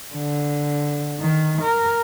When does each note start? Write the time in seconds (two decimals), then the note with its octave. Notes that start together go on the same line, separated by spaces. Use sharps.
0.14 D3
1.20 D#3
1.62 A#4